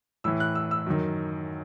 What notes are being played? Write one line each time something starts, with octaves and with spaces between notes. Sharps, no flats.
A2 E3 E6
F#6
E6
E6
F#2 D#3